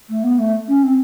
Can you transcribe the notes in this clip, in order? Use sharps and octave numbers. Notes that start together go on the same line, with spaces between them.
A3
B3
A3
C#4
C4